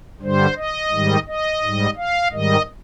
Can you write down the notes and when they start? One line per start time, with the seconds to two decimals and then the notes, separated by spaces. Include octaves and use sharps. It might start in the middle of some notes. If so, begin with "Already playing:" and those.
0.22 G2 D3 G3 C5
0.57 D#5
0.91 G#2 D#3 G3
1.27 D#5
1.63 G#2 G3
1.97 F5
2.32 G#2 D#3 G3 D#5